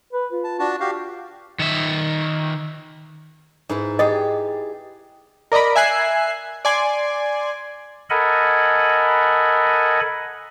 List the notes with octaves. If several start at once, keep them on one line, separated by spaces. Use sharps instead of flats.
B4
F4
A5
D4 F#4 A5
F#4 G4 F5
D#3 E5
G#2 E4 B4
G4 G#4 D#5
A#4 D5 D#5 A#5 B5
E5 G#5 F#6 C7
D5 G#5 C6
A4 A#4 D#5 F#5 G#5 B5